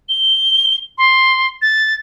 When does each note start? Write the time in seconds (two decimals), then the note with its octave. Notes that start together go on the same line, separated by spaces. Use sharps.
0.09 G7
0.98 C6
1.62 A6